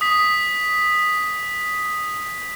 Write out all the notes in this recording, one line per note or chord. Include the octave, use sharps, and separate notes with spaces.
D#6 B6